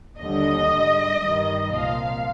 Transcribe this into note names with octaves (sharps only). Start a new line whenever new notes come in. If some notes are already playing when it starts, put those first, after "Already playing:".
D#2 D3 G3 D#5
G#2 G3
G2 D#3 G3
C2 A#2 F3 F5